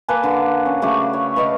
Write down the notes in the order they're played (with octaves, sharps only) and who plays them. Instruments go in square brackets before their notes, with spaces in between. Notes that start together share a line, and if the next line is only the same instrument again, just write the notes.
[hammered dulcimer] A#3 B4 G#5 A5
D3
C#4
C#3 A3 F#4 D6
C#5
B4 D#5 F5